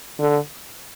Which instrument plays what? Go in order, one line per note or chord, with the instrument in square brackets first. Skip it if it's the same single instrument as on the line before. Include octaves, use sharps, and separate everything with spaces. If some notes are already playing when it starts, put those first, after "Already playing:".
[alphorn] D3